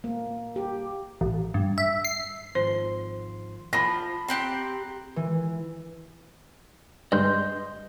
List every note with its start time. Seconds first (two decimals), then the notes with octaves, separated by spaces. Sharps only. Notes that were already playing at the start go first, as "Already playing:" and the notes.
0.04 A#3
0.56 G4
1.21 A1
1.54 G2
1.78 E5
2.05 C7
2.55 G#1 F3 C5 C6
3.73 F3 A5 B5 A#6
4.28 C4 G4 G5 A#5 C6 F#6
5.16 E3
7.12 G2 D#5 C6 G6